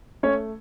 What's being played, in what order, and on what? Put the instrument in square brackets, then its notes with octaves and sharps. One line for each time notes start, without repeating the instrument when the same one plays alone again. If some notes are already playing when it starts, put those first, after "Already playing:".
[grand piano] A3 C#4 C#5